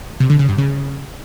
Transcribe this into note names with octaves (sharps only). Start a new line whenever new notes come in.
C3
D3
C#3
G2
C#3